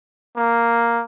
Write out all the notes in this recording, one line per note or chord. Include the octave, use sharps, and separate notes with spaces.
A#3